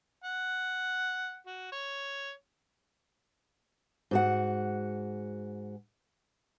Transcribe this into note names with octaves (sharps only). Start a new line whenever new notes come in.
F#5
F#4
C#5
G#2 F#4 F#5